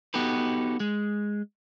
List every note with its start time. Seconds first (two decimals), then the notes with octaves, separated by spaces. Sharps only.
0.14 B3 D#4 F#4 G4 A4 B4
0.80 G#3